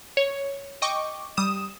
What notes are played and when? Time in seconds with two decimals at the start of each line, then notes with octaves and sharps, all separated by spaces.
0.17 C#5
0.82 D#5 G5 C#6 D6
1.37 G3 D#6 E7